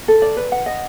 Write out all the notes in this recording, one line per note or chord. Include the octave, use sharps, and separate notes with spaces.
A4
D5
B4
F#5
D#5